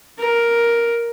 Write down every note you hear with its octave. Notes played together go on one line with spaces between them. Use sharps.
A#4